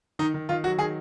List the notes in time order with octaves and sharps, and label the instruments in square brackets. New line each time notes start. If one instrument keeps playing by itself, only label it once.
[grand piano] D#3 D#4
D#3
D#3 F4
F#3 F#4
D#3 G#4